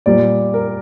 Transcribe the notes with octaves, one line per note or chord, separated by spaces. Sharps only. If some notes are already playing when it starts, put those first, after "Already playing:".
A#2 G3 A#3 D5
A#4